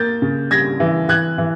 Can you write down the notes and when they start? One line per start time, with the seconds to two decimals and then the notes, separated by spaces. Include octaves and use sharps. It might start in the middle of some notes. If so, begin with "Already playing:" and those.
Already playing: A#3 G6 A6
0.22 C#3
0.51 G3 G#6 A#6
0.80 E3
1.09 E3 F#6 G#6
1.38 E3